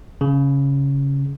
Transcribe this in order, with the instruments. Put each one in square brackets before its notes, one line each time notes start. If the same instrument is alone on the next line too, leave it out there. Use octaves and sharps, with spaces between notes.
[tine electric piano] C#3